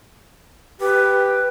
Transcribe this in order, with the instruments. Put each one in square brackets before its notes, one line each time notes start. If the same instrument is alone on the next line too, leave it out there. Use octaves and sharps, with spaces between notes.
[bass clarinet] G4 [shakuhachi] B4